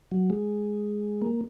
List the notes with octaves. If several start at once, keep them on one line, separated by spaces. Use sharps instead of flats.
F#3
G#3
A#3